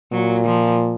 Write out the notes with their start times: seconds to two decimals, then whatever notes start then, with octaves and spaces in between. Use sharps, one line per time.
0.12 A#2 F#3
0.46 F3